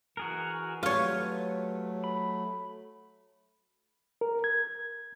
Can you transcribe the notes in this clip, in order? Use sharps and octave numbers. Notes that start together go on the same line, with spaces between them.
E3 F#4 G#4 A#4
F#3 A3 F4 G4 B4 C#5 F6
B5
A#4
G#6